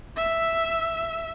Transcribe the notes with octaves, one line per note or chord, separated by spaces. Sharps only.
E5